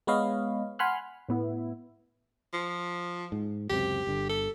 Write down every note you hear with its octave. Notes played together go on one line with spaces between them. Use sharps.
G#3 B3 B4 C#5 D#5 F5
F#5 G#5 B5 C6 F6 F#6
A2 B3 E4
F3
G#2
C#2 F#2 C3 G4
G1 D3
A4